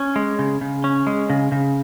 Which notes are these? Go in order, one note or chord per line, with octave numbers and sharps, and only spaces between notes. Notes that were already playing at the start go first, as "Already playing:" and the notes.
Already playing: C#4
G#3
C#3
C#3
C#4
G#3
C#3
C#3